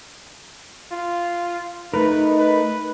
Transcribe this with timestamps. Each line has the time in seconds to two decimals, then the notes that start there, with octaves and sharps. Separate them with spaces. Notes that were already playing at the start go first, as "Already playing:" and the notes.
0.92 F4
1.94 A3 D#4 A#4 B4
2.39 B4